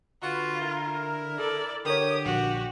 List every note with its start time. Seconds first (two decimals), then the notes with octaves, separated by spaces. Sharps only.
0.23 D3 F4 F#4 B4
0.61 E4 A#4
1.39 A4 D5
1.86 D3 G4 A#4 C#5 D#6
2.26 A#1 F#4